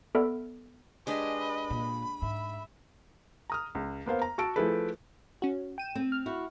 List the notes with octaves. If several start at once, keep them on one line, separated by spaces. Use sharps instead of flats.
B3 A4 D5 E5 B5 F6
G#3 D4 G4 B4 D#5 G#5
B5
A#2
G#2 E5
A#5 D#6 F6
C#2
A#3 B3 C5 F5
A#5
F#4 F#5 A5 E6 D7
F3 A3 E4 G#4 A4 B4
C#4 F#4
G5 D#7 E7
C4
F6
E4 F#4